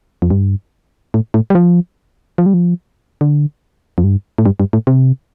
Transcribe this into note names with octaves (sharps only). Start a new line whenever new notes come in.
F2
G2
A2
A2
G3
F3
F3
G3
F3
D3
F2
G2
A2
G2
G2
A2
C3